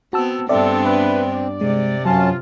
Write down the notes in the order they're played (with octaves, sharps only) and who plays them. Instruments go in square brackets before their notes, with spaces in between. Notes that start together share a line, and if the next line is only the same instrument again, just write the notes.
[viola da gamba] B3 C4 [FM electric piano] F#4 A5 E6
[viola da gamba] G2 B3 D4 [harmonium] C4 [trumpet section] A4 [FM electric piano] D5 E5
[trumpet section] B4
D5
[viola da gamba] C3 [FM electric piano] G#3
[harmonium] F#2 C#4 A5 [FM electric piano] F#3 [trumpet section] F4